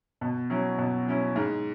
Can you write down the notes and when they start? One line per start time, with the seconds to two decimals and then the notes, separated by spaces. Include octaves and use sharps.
0.21 B2
0.50 F#3 C#4 E4
0.78 B2
1.07 F#3 C#4 E4
1.36 G#2